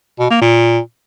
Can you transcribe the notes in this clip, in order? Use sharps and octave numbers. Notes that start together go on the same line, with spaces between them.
B2
A#3
A#2